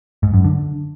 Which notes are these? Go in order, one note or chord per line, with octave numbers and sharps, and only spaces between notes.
G#2
F#2
D3